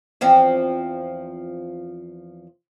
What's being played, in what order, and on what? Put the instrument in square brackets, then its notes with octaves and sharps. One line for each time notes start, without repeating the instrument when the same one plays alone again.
[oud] E2 F3 C4